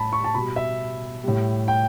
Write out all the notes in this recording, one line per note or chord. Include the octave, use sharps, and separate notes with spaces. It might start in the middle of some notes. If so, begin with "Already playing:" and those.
Already playing: A2 G3 A5 B5
C#6
A5
B2 G3 B5
E5
A2 G3
G5